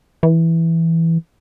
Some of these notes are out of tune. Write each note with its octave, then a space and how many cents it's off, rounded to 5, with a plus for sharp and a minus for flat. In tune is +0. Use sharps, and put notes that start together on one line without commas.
E3 +0